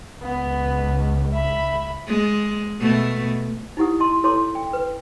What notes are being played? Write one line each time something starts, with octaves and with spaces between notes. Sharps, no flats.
C#2 B3
E5 B5
G#3
B2 A3
D#4 E4 G4 F#5 D#6
E4 D#5 A5 C6
E4 A4 C#5 A5 C6 D6
G5
B4